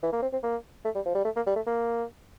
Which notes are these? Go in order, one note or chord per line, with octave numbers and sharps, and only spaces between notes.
E3
A#3
C4
C4
A#3
A3
G3
F3
G3
A3
A#3
G3
A3
A#3